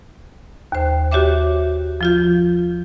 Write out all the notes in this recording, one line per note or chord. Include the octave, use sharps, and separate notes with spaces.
D#2 C5
F#4 G4 C#5 E5 D6
F3 F4 G6